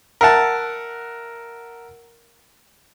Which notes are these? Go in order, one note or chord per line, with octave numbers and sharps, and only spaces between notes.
A#4 E5 F#5 A5